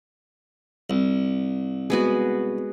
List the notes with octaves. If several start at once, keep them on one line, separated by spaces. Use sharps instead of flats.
C2
G#3 B3 F#4